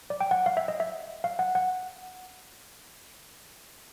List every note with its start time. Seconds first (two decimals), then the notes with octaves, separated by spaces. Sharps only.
0.10 D5
0.21 G5
0.31 F#5
0.46 F5
0.57 E5
0.68 D#5
0.80 E5
1.24 F5
1.39 F#5
1.55 F#5